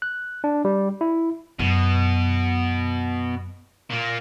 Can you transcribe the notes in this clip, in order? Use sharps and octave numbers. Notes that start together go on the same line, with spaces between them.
F#6
D4
G3
E4
F#2 B2
A#2 A#3